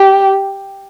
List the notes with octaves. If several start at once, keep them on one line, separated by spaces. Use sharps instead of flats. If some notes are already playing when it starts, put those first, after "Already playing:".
Already playing: G4